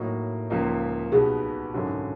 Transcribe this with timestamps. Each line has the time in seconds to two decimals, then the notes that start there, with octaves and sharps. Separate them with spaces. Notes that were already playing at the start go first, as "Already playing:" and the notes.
Already playing: A2 F#3 A#3 D#4 F#4
0.50 C#2 C#3 F3 A#3 D#4
1.12 B1 B2 G3 B3 G#4
1.73 G#1 F#2 D3 F#3